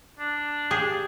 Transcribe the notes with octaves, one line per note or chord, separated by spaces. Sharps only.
D4
G4 G#4